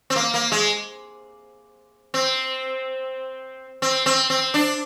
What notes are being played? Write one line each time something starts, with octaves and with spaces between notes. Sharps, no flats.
C4
A#3
A#3
G#3
C4
C4
C4
C4
D4